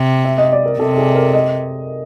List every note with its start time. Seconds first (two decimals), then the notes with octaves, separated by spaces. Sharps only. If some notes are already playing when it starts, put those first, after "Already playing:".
Already playing: C3
0.25 E5
0.38 D#5
0.52 D5
0.66 A#4
0.79 C3 A4
0.97 G#4
1.15 A#4
1.34 D#5